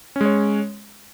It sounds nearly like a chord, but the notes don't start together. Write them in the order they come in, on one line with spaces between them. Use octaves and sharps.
C#4 G#3 C#5